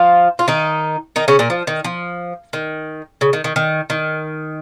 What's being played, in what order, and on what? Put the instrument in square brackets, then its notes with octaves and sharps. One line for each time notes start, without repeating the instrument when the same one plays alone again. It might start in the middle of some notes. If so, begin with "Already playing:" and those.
Already playing: [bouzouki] F3 F4
F4
D#3 D#4
D#3 D#4
C#3 C#4
A#2 A#3
F3
D#3
F3
D#3
C#3
D#3
D#3
D#3
D#3